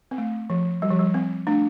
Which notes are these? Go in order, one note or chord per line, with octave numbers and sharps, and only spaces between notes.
C4
A3
F3
G3
F3
G3
C4
A3 D4